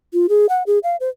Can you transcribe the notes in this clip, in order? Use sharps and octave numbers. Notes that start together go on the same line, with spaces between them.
F4
G#4
F#5
G#4
F5
C5